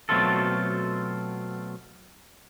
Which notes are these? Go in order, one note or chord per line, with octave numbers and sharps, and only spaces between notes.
B2 F#3 A3 C4 F4 A4